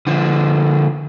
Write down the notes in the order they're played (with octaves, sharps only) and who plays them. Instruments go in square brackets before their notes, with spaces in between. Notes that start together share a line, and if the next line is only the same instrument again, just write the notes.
[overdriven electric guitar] D3 F3